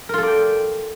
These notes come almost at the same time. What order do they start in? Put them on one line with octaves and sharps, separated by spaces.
A#4 F4 A4 D5 G5